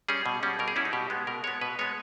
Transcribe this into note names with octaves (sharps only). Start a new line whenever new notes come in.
G3 C#4 G#4
B2
G3 C#4
B2 A#4
G#4
G3 C#4 E4
D#4
B2 G4
G#3 B3
B2 A#4
G#3 B3 C#5
B2 B4
G#3 B3 C#5